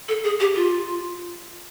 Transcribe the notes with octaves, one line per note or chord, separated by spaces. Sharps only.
A4
G#4
G4
F4